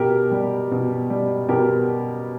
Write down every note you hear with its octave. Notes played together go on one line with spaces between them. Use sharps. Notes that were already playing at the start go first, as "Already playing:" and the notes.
Already playing: B2 G4 A#4
G3
B2
G3
B2 G4 A#4